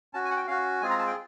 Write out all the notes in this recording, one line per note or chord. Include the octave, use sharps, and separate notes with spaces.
C#4 F#4 A5
G#5
F#5
G5
C#4 F#4 F5
G#3 C4 F4 G#4 G#5
A#5
A5
G5